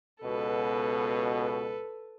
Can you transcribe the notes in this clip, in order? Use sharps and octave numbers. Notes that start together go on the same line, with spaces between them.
C#2 B2 A4 B4